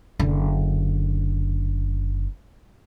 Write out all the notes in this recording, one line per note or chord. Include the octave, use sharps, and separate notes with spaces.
F#1 D3